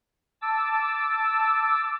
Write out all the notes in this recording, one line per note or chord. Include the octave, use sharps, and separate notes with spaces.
A5 D6 E6